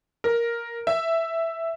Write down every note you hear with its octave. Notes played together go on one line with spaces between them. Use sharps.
A#4
E5